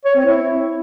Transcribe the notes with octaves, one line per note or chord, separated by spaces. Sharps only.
C#5
C4
E4